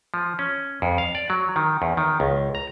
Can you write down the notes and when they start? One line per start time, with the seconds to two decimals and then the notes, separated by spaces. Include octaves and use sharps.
0.14 F3
0.39 C#4
0.82 F2
0.98 F5
1.15 D5
1.30 F#3
1.56 D#3
1.82 E2
1.97 D#3
2.20 C#2
2.55 A#5